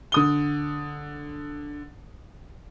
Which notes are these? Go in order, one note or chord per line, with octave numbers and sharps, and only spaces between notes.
D3 D#6 G7